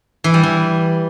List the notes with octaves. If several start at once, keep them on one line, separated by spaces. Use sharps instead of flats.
E3
G3
E3